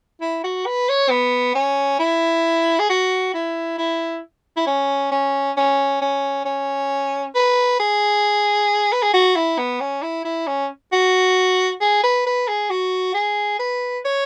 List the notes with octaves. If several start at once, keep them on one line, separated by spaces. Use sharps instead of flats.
E4
F#4
B4
C#5
B3
C#4
E4
G#4
F#4
E4
E4
E4
C#4
C#4
C#4
C#4
C#4
B4
G#4
B4
G#4
F#4
E4
B3
C#4
E4
E4
C#4
F#4
G#4
B4
B4
G#4
F#4
G#4
B4
C#5